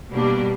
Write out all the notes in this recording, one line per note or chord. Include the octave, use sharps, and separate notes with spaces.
B2 G3 A#3 D4